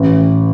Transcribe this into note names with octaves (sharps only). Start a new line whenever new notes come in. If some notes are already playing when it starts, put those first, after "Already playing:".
Already playing: A1